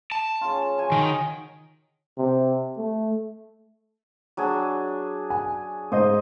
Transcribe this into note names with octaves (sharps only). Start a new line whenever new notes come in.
A5
C#3 F4
F#3 G#5 A5
D#3
C3
A3
F#3 D4 G#4
G#5
G#2 C5 D#5 D#6